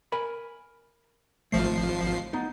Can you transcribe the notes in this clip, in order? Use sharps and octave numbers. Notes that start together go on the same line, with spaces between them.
A#4 G#5 B5
G#1 F3 A3 F5 C7
B3 D#4